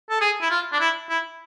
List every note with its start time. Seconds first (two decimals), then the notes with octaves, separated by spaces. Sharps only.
0.10 A4
0.21 G#4
0.42 E4
0.51 F4
0.72 D4
0.80 E4
1.10 E4